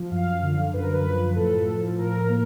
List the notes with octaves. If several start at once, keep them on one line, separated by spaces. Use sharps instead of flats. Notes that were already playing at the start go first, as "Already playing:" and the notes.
Already playing: F3
F#2 F5
D3
F#2 B4
A#4
B4
F3
A2 A4
F3
A2 A#4
A#3